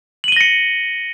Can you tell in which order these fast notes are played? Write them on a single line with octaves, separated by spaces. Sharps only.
F#7 D#7 G7 A#6 C#7